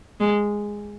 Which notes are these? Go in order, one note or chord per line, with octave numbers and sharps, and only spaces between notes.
G#3